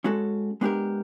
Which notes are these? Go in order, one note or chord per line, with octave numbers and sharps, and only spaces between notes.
G#3 C#4 F#4 A4
G#3 B3 D4 G4 A#4